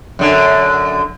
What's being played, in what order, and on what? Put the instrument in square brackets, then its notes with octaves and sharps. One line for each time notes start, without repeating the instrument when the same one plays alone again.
[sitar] F#2 D3